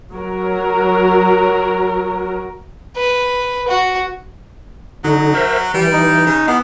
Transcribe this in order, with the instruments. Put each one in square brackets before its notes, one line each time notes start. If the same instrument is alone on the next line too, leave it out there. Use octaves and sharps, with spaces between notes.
[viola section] F#3 F#4 A#4
[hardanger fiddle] B4
F#4
[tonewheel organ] D3 D#4 [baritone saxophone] F#3
[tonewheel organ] A#4 C5 E5
[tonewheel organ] E3 [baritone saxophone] G3
[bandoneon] D#4
[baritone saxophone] C#3
[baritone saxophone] E3 [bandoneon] B3 [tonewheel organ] F5